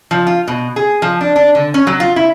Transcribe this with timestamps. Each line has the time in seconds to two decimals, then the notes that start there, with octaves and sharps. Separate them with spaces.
0.11 F3
0.27 F4
0.48 B2
0.76 G#4
1.02 F3
1.21 D4
1.36 D4
1.55 D3
1.74 C#4
1.87 F#3
2.00 F4
2.16 E4